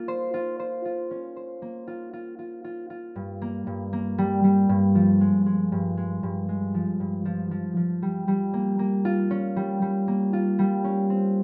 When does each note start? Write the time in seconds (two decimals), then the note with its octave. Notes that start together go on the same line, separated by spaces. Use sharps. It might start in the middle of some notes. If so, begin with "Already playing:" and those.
Already playing: A#3 F4
0.08 C5
0.34 F4
0.59 C5
0.85 F4
1.11 C#4
1.36 C5
1.62 A#3
1.87 F4
2.13 F4
2.39 F4
2.64 F4
2.90 F4
3.16 G2
3.42 A#3
3.67 G2
3.93 A#3
4.18 G3
4.44 G3
4.69 G2
4.95 F3
5.21 G#3
5.46 G#3
5.72 G2
5.97 G#3
6.23 G2
6.49 G#3
6.74 F3
7.00 G2
7.25 F3
7.51 F3
7.77 F3
8.02 G3
8.28 G3
8.54 A#3
8.79 A#3
9.05 F4
9.31 C#4
9.56 G3
9.82 G3
10.08 A#3
10.33 F4
10.59 G3
10.84 C#4
11.10 C4